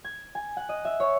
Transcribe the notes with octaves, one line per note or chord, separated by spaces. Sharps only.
G#6
G#5
F#5
D#5
E5
C#5